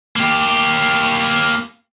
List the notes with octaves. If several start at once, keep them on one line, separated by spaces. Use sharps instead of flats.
A#3 G4